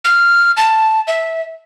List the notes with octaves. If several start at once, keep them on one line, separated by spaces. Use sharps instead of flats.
F6
A5
E5